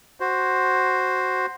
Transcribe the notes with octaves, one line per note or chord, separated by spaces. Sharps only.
F#4 C5